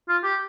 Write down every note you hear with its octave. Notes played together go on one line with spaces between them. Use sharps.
F4
G4